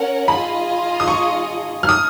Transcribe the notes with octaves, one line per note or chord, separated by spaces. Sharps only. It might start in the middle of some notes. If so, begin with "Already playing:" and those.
Already playing: C#4 A#4 C#5 F#5
F4 G#4 D#5 B5
D#6
C#6
F6
D#6